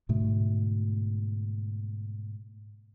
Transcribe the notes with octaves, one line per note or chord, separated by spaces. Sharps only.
G#2 B2 D3 A3